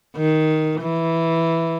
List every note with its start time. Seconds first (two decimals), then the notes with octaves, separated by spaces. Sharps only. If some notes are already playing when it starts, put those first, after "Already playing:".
0.16 D#3
0.82 E3